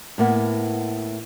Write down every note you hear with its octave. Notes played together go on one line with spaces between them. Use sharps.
A2 A#3 B3